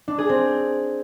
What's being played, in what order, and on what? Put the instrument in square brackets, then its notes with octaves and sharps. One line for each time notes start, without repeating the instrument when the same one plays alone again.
[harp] D4
G#4
C4